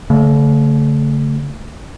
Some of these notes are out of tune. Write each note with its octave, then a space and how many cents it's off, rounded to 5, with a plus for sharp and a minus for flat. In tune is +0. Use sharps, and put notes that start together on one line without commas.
D3 -45 A3 +15